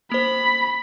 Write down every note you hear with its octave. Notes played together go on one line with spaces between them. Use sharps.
A#3 C5 B5